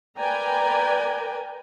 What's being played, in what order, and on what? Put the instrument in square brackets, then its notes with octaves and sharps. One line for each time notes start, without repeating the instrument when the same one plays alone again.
[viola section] A#4 B4 D5 G5 G#5 A#5